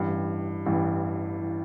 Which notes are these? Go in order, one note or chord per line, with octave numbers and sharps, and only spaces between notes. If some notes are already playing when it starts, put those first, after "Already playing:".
Already playing: A1 G2 E3
A1 G2 E3
E3